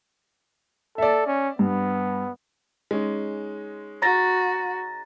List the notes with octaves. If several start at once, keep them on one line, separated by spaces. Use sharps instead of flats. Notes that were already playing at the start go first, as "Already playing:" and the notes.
A4 D5 E5
C#4
G2 B3
G#3 C#4 D#4
F#4 A#5 A6 A#6